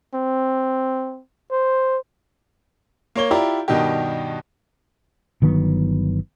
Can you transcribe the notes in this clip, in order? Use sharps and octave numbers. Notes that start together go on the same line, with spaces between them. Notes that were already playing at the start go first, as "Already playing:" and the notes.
C4
C5
A#3 C#5 G7
E4 F4 G4 D5 A#5
G2 B2 D#3 G3 D#4 G4
G1 D#3 F#3 B3